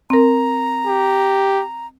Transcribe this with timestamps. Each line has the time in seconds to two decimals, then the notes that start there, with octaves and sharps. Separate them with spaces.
0.10 C4 A#4 A#5
0.87 G4